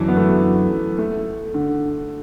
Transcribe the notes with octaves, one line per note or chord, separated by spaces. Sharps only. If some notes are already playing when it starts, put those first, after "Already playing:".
Already playing: F#2 D3 E3 F#3 D4
B3
A3
A3
D3